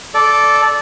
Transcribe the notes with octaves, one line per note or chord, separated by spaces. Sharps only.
A4 D5